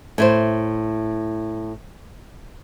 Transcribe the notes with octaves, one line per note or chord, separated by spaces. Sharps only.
A2 E4 C5